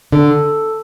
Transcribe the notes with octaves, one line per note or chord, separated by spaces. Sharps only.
D3 A4